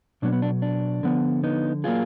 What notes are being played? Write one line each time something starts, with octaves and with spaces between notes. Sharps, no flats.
B2 F#3 B3 D4
B3
D4
D4
D3 F3 B3
B3 D#4
F#3 A#3 F4 G#4